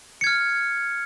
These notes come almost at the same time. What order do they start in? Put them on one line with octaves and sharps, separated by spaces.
C#7 G#6 F6